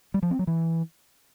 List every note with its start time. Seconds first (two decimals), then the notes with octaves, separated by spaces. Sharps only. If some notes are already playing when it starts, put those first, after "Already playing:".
0.14 G3
0.23 F3
0.31 C4
0.39 F#3
0.47 E3